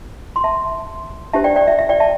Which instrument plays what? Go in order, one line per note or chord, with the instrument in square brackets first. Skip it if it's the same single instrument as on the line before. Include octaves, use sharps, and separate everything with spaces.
[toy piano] C6
E5 A5
D4 G4 C5 E5 A5
D5 G5
D5 G5
E5
E5
D5 G5
E5 A5